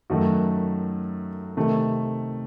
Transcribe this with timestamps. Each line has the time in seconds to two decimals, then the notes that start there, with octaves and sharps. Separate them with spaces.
0.10 F#2 D#3 A3 F#4
1.57 C3 D#3 A3